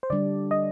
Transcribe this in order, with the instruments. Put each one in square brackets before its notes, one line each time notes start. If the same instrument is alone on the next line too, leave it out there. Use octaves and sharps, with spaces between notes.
[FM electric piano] C5
[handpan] D3 G3 D4 [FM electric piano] D5
[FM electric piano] D#5